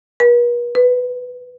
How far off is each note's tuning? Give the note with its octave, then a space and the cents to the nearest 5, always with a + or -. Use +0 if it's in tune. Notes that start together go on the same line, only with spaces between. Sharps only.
B4 -45
B4 +10